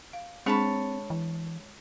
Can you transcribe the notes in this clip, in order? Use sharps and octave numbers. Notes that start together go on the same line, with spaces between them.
F5
G#3 C4 D4 G#4 C#5 A5 B5
E3